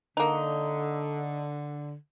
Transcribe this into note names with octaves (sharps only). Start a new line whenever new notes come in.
D3 A#3 D#4